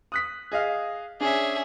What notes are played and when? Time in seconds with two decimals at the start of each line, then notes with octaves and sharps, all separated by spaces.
0.12 D#6 F#6 B6
0.52 G#4 D#5 F5
1.21 C#4 D4 G#4 E5